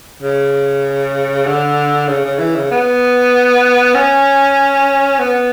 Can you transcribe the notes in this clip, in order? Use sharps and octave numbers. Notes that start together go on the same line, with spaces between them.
C#3
D3
C#3
C#3
E3
C#3
B3
C#4
B3